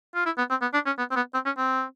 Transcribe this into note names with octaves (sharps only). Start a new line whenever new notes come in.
F4
E4
B3
C4
B3
D4
C#4
B3
C4
B3
C4
C#4
C4